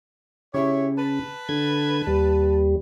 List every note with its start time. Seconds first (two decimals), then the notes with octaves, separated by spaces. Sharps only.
0.54 C#3 E4 G4 C#5
0.98 B4 A5
1.49 D3 G#6
2.07 D#2 G3